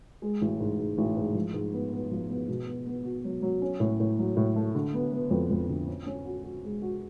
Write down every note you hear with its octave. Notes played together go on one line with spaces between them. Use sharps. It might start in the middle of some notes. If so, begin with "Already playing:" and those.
G#3
A1
G#2
G#2
A1
G#2
F3
G#2
B3
B3
F3
B3
B2
B3
B3
F#4
F#3
F#3
C#4
A2
A2
F#3
A2
A3
D3
B3
B3
F2
F2
D3
C#4
C#4
F#4
F#4
G#3
F#4